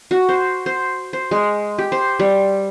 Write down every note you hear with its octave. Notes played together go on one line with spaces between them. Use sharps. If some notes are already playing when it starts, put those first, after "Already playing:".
F#4
C5
C5
C5
G#3
G4
C5
G3